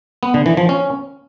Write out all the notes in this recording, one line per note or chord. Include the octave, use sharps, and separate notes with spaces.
B3
D3
E3
F3
C#4